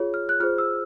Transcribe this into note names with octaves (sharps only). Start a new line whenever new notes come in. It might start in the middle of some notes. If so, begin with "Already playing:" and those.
Already playing: F4 G#4 C#5
F6
F#6
F4 G#4 C5 F6
E6